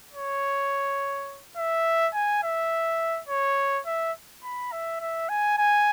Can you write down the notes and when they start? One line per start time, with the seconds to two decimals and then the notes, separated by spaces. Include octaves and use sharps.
0.14 C#5
1.57 E5
2.14 G#5
2.43 E5
3.29 C#5
3.86 E5
4.44 B5
4.72 E5
5.00 E5
5.29 G#5
5.58 G#5